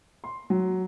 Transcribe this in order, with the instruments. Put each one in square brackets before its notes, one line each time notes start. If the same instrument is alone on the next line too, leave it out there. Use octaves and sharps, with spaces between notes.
[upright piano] C6
F#3